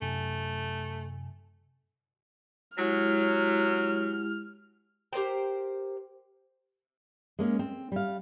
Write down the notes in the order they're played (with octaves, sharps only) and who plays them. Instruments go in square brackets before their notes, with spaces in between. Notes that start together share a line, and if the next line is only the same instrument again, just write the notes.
[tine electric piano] F#2 C3 G#5 [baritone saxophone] A3
[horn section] F#3 [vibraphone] G#3 E4 G4 [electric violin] F6
[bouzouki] G4 A#4 C5 G5
[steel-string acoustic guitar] G#3 A#3 C#4
C4
G3 F5